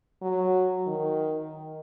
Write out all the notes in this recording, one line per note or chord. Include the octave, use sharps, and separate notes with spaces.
F#3
D#3